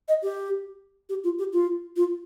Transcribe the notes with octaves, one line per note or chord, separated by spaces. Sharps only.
D#5
G4
G4
F4
G4
F4
F4